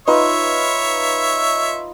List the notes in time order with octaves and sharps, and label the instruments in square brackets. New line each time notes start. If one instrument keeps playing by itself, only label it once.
[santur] D#4 F4 B4 [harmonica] C#5 E5